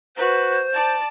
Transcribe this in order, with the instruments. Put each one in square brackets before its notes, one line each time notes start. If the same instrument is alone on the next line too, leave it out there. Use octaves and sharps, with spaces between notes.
[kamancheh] F#4 B4 [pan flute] C5
[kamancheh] D5 A5